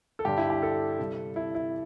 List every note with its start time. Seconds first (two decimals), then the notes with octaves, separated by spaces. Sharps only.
0.19 A4
0.25 G2 D3 G3 G4
0.37 E4
0.50 G4
0.62 A4
0.99 C3 G3
1.36 E4
1.55 E4